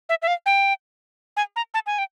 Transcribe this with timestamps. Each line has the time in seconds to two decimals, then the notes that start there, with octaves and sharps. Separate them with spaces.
0.09 E5
0.22 E5
0.27 F5
0.46 G5
1.37 G#5
1.56 A#5
1.74 A5
1.86 G#5
1.98 G5